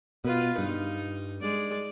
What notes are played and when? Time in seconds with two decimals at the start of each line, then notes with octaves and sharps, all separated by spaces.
0.25 B2 F4 B4
0.58 G2 D#4
1.41 G#3 D5